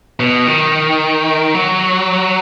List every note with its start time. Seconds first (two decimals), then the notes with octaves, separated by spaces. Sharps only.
0.20 B2
0.47 D#3
1.55 F#3